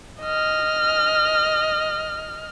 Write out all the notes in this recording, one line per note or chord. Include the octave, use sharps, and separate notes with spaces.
D#5 F6